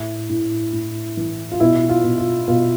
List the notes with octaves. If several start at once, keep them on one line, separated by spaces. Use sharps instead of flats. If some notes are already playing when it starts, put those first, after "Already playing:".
Already playing: A2 E4
A2
A2
E3
F4
B2 E4
F4
B2
F4
B2 F4